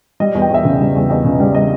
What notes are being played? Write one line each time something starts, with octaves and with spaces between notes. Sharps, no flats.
G3 D#5
E2
G5
E2 E5
C#3
G3
E2
E2 D#5
C#3
G3
D#5